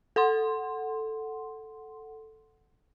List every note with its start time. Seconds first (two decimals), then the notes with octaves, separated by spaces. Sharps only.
0.16 A4 F#5 C6